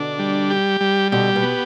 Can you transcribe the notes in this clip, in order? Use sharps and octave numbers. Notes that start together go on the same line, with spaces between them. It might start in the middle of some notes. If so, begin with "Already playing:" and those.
Already playing: B2 D3 D4
G3
G4
G3
B2 D3 G4
B2
B3